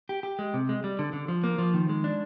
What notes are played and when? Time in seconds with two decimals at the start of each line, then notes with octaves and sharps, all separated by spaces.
0.09 G4
0.23 G4
0.39 G#3
0.54 C3
0.69 G#3
0.84 G3
0.99 D3
1.13 D3
1.28 F3
1.44 A#3
1.58 F3
1.74 D#3
1.89 G#3
2.04 D4